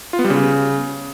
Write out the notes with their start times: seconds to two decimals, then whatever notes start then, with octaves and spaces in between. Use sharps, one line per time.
0.13 F4
0.19 B3
0.24 G3
0.30 C#3